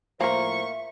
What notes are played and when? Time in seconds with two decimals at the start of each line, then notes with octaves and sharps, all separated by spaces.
0.21 A2 F3 A#3 A#4 C5 E5 C#6